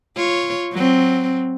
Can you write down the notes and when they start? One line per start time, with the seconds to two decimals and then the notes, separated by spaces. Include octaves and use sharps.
0.16 F4 C#5
0.73 F#3 C4